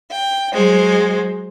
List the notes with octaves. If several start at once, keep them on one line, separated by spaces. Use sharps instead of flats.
G5
F#3 G#3 C5